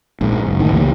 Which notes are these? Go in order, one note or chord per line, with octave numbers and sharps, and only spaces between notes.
A#1 G#2
F#1
A2 D#3
C#2 E3 A#3